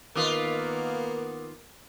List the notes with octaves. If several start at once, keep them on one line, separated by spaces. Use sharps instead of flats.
D#3 A#3 B3 F4 A#4 B4 D6 D#6